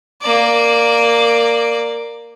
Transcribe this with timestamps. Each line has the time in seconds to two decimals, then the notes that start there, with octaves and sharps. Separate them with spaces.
0.21 A#3 D5